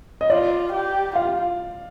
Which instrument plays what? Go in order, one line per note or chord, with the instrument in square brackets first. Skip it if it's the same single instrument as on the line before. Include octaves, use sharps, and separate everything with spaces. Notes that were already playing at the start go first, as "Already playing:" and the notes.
[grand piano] D#5
[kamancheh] F4 [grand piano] D5
[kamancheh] G4
[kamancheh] F4 [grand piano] F5